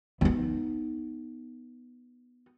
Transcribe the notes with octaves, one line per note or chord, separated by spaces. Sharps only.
B3 D#4